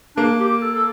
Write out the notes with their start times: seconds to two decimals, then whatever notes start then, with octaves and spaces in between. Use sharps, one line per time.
0.16 A#3 D4
0.39 G4
0.62 A4
0.75 A4